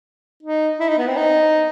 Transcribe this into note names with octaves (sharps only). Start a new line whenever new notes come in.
D#4
E4
D#4
B3
C4
D#4